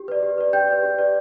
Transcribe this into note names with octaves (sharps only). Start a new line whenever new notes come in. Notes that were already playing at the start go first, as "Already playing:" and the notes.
Already playing: G4
B4 D5
G4
B4 D5
G4 G5 G6
B4 D5
G4
B4 D5